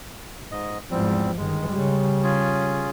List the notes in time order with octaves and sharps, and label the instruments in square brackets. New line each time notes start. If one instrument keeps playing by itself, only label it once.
[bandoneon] G#2 D#5
[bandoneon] E2 G3 C4 [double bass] G#2 F3
[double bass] G1 D#3 [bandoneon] G#3
[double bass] C#3 G3
[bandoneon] C#4 F4 G#4